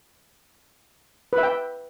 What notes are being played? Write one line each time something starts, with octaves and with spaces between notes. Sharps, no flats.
B4
E5
G5